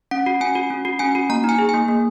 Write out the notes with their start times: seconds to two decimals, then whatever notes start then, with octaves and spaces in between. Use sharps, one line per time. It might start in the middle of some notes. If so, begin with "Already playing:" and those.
0.11 C#4 F#5
0.26 F#4
0.41 C#4 G#5
0.55 F#4
0.70 C#4
0.85 F#4
0.99 C#4 G#5
1.15 F#4
1.30 A#3 A#5
1.44 D#4 G#5
1.59 G#4
1.69 A#3 G#5
1.88 A#3